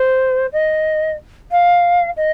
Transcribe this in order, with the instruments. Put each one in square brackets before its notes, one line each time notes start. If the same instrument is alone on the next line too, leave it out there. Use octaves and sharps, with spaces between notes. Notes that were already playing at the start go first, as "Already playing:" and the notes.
Already playing: [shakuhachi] C5
D#5
F5
D#5